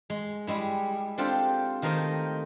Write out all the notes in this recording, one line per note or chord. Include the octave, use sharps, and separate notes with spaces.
G#3
G3 G#3 E4
C4 D4 F4 G4 A4 C5
D#3 A3 A#4 C5 D#5